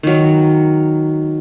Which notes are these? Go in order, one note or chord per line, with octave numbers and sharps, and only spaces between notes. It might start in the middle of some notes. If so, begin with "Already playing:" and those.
D#3 F#3